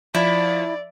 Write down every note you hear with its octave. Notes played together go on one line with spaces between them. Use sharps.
F3 E4 D5